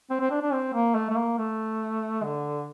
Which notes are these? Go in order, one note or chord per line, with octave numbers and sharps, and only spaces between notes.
C4
C4
D4
D4
C4
A#3
A3
A3
A#3
A3
D3